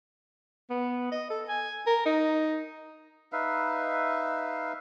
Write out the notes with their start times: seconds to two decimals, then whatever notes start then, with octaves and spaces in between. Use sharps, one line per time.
0.70 B3
1.11 D#5
1.30 A4
1.49 G#5
1.87 A#4
2.06 D#4
3.32 D#4 B4 E5 F5